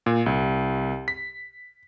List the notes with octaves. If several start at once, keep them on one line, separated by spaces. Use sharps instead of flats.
A#2
C2
B6